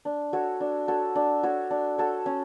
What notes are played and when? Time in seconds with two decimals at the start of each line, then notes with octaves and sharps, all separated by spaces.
0.05 D4
0.33 F#4 A4 C#5
0.61 D4
0.88 F#4 A4 C#5
1.15 D4
1.43 F#4 A4 C#5
1.71 D4
1.98 F#4 A4 C#5
2.26 C#4